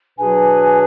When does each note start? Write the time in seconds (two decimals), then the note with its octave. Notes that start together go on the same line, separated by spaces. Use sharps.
0.18 B2 F#3 D4 G#4 B4 G#5